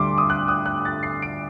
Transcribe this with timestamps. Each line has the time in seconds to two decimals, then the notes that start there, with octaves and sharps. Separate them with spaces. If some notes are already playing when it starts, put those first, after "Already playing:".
Already playing: D2 D3 G3 C6 D6
0.18 D#6
0.30 F#6
0.48 D#6
0.66 F#6
0.85 A6
1.03 C7
1.22 D7